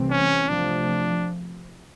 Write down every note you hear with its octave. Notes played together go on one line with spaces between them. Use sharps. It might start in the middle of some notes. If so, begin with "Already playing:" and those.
Already playing: C2 C3 E3 A3 C4
C#4
C3 F3 A3 D4